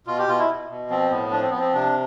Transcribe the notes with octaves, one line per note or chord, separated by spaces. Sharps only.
B2 F4
G4
B2 F4
E4
B2
B2
F3 C4
A2 B3
F3 D4
C4
F3 B3
C4
C3 D4